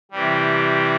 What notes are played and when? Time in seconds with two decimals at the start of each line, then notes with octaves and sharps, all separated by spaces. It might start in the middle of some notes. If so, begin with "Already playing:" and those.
0.11 C3 E3 G3